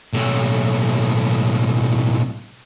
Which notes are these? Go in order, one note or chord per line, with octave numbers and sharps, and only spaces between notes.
B1 A2